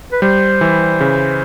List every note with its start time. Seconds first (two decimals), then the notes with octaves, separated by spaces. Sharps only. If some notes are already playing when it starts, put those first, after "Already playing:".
0.12 B4
0.22 G3 C5
0.61 E3
1.01 C#3